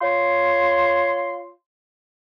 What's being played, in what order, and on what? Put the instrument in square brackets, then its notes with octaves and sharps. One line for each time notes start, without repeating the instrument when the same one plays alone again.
[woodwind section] F4 C#5 C6